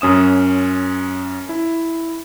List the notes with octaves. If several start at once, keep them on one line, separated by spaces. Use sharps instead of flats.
F#2 C#4 D#6 E7
E4